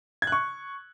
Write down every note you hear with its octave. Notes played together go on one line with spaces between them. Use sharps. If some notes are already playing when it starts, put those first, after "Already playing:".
G#6
F#6
C#6